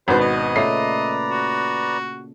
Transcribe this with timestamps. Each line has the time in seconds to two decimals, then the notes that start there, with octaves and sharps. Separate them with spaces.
0.08 G#1 B2 D4 F#4 B4 C5 A5
0.20 D#5
0.56 A#2 C#3 A3 B4 D5 A#5 C7
1.31 F#4